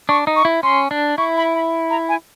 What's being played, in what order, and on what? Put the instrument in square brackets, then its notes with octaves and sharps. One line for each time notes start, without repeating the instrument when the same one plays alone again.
[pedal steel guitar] D4 [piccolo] C#6
[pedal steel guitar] D#4
[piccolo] C#6
[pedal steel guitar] E4
[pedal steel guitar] C#4 [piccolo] C6
[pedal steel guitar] D4
[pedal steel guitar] E4 [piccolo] C#6
[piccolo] B5
B5
A#5
G#5